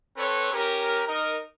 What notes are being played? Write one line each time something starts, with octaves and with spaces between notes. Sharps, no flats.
C4 A4 B4 C#5
C#4 G4 A#4
D#4 A#4